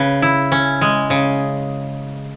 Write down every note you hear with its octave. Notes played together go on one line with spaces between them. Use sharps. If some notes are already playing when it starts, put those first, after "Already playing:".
Already playing: C#3 B4
E4
C#4
G#3
C#3